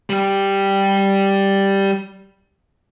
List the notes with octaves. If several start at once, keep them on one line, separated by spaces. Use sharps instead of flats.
G3 G4